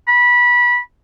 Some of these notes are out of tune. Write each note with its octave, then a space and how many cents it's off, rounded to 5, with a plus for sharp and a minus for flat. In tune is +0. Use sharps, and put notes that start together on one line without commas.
B5 -20